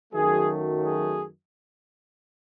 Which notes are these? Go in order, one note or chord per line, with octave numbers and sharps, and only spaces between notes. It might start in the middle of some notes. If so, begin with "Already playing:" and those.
F#2 D#3 F#3 A3 G#4
G#4